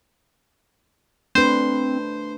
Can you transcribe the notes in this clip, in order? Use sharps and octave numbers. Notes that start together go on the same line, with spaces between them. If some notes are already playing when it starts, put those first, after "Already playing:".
A3 C4 D4 B4 C5